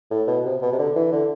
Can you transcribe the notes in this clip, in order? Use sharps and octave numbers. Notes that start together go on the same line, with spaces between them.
A2
B2
C3
B2
C3
D3
E3
D3